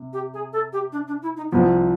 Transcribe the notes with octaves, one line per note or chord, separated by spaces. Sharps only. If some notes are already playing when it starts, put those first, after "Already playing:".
Already playing: C3
G4
G#4
A4
G4
D4
D4
E4
D#4
C2 C3 F3 B3